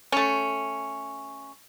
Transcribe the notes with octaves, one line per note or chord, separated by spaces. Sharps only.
A3 C#4